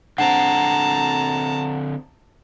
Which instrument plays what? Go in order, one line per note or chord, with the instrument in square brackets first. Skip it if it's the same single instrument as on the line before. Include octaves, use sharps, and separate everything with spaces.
[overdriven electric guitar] D3 C4 [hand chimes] F#5 [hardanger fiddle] A5 A#5